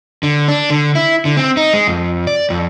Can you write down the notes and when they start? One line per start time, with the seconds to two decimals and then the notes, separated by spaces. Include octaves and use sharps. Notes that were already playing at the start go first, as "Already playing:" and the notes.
0.23 D3
0.48 D4
0.70 D3
0.95 E4
1.25 D3
1.37 C4
1.57 D#4
1.73 G#3
1.87 F2
2.27 D5
2.50 F2